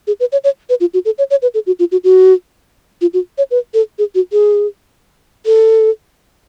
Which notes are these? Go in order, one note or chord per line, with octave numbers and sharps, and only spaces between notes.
G#4
B4
C#5
C#5
B4
F4
F#4
A4
C#5
C#5
B4
A4
F#4
F4
F#4
F#4
F4
F#4
C#5
B4
A4
G#4
F#4
G#4
A4